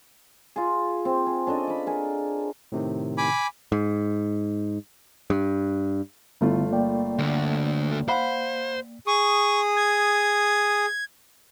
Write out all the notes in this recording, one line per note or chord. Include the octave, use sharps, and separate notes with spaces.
F4 G#4
C4
G#4
C#4 D4 A4 D#5
D5 B5
G#4 A#4
A2 C3 D#3
G#5 B5 D6
G#2
G2
G1 D3 A3 B3 E4 F4
A#3 D5 G5
D2 D3
C5 F5 F#5 B5
G#4 C#6 D#6
G#6